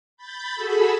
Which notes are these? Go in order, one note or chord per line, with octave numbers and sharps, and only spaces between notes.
B5 G6 A6
F#4 G#4 A4 B5 E6